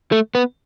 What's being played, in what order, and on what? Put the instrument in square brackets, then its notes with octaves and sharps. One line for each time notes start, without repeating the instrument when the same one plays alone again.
[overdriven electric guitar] A3
B3